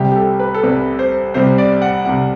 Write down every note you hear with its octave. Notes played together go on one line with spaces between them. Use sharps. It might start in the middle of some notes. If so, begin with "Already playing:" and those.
Already playing: C2 C3 G3 G4
G4
A4
B4
A4
C2 C3 G3 B4
C5
C2 C3 G3 C5
D5
F#5
C2 C3 G3 F#5